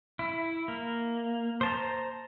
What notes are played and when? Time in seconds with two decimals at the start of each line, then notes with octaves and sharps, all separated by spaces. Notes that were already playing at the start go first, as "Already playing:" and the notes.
0.19 E4
0.68 A#3
1.61 C5 A5 A#5